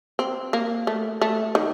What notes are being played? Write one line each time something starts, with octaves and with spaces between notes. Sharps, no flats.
C4
A#3
A3
A3
D#3